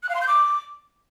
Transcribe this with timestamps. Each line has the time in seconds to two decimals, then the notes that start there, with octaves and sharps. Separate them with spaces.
0.03 F#6
0.09 F5
0.15 C6
0.21 G6
0.27 D6